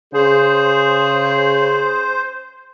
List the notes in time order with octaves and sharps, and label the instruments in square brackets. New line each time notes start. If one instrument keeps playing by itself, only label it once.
[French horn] C#3 [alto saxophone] G#4 [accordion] C5